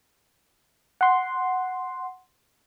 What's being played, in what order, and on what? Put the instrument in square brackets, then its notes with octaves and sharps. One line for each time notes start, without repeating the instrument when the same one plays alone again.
[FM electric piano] F#5 C6